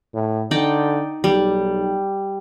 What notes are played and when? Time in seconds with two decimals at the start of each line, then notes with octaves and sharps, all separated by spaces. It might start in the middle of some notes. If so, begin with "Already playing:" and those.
0.14 A2
0.51 D3 D#4 D5 G5
1.24 B1 G3